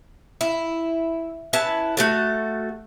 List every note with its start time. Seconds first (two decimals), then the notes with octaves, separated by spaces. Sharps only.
0.41 E4
1.53 C#4 E4 B4 A5
1.97 A3 F#4 A4